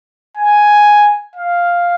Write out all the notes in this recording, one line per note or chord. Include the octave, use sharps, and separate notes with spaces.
G#5
F5